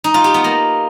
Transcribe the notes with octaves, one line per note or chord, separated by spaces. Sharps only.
D#4
F4
G4
B3
A#3